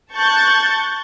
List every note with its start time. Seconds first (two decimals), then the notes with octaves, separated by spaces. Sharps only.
0.13 A5 C#6 F#6 G6 A6